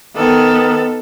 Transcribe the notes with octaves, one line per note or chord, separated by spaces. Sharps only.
D#3 B3 A4